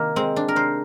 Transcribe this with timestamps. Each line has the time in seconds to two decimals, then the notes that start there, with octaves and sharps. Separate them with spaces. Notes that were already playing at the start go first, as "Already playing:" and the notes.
Already playing: C3 D#3 A#3
0.16 G#3 C4
0.36 D4
0.48 A#4
0.56 C3 C5